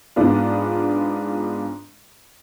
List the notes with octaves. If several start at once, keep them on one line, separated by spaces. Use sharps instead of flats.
G#2 B3 D4 F4